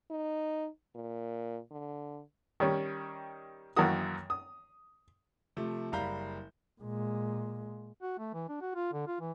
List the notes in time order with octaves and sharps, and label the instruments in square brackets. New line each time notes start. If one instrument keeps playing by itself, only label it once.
[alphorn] D#4
A#2
D3
[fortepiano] D#3 G3 C#4
F#2 D#3 E3 A#3 F#4 D#6
D#6
[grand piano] C3 F3 A3
F#1 G3 F5 A#5 B5 G6
[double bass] A#2 G#3
[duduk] F#4
A3
E3
D4
F#4
F4
D3
F4
E3